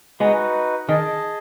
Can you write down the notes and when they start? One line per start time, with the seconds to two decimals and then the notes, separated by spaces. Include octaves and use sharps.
0.20 G#3 B3 D#4 F#4 B4
0.89 D#3 G#4 D#5 A5